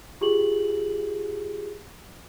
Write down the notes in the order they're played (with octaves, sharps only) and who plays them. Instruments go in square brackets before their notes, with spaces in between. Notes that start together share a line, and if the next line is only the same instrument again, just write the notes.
[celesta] F4 G4 G#4 F#7